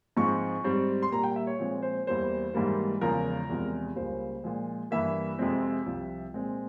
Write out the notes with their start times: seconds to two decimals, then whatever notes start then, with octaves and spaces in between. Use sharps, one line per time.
0.16 G#2 F3 G#3 C4 C#6
0.64 G#2 G3 C4
1.02 C6
1.11 A#2 G3 A#3 A#5
1.23 G5
1.36 E5
1.47 C#5
1.59 A#2 F3 G#3 C4 C#5
1.82 C5
2.07 E2 E3 G3 A#3 C5
2.54 G#2 E3 G3 A#3
3.01 E2 C#3 F3 G#3 A#4
3.50 E2 C3 F3 G#3
3.96 C#2 C#3 G3 A#3 C5
4.44 A#2 F3 G#3
4.91 G2 E3 A#3 E5
5.39 F2 C3 F3 G#3 C4
5.86 C2 C3 F3
6.34 A#2 G#3 C4